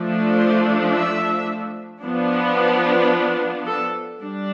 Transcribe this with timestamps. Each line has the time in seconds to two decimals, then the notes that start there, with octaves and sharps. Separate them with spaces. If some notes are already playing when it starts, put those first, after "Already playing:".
Already playing: F3 A3 D4
0.37 C5
0.92 E5
2.02 F3 B3 D4
3.67 A4
4.21 G3 D4